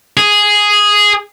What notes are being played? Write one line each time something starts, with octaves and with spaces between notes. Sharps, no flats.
G#4